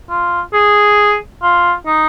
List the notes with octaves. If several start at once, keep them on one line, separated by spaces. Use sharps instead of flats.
F4
G#4
F4
D#4